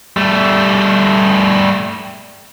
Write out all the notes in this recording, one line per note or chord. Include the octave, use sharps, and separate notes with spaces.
G3 A3